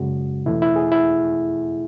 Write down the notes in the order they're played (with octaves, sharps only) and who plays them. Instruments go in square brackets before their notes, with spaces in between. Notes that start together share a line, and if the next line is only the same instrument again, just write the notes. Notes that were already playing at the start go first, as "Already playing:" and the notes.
Already playing: [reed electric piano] F#2 C#3 G#3 F#4
E2 B2 A3 E4
E4
G#4
E4